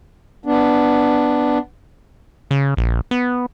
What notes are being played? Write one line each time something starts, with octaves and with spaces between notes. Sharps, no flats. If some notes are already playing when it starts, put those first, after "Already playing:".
B3 D4
C#3
A#1
B3